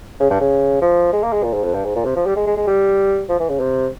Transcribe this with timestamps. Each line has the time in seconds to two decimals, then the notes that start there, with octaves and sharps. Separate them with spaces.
0.20 C#3
0.30 G2
0.41 C#3
0.81 F3
1.13 G#3
1.23 A#3
1.33 G#3
1.43 A#2
1.54 G#2
1.64 F2
1.74 G2
1.85 G#2
1.95 A#2
2.05 C3
2.16 F3
2.26 G3
2.36 G#3
2.47 G#3
2.57 G#3
2.67 G3
3.29 F3
3.40 E3
3.50 C#3
3.60 C3